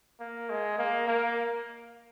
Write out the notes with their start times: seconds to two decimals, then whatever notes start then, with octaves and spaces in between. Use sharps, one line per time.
0.20 A#3
0.50 G#3
0.78 A#3
1.07 A#3